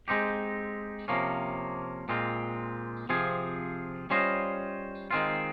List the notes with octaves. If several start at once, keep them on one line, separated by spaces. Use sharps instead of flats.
G#3 C4 D#4 G4
C3 F3 A#3 C#4
A#2 G#3 C4 F4
C3 F3 C4 F4 G#4
G3 C#4 F4 C5 D#5
D#3 G#3 C4 F4